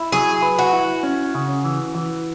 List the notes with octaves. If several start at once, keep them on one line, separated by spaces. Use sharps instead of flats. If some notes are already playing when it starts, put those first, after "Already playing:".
Already playing: E4
F#3 G#4
B4
F#4
E4
C#4
C#3
E3
E3